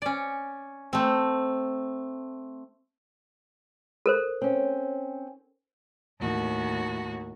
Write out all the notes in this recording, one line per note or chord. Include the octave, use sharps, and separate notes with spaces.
C#4 D5
A3 C4
A4 A#4 C5
C4 C#4
D#2 A2 F#4